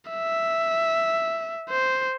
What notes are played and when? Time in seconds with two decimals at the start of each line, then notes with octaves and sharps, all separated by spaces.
0.11 E5
1.69 C5